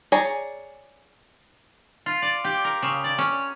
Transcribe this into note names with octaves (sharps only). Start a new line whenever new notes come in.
G#4 C#5 D5 G#5 A#5
F4
D5
G4
A#4
C#3
D5
C#4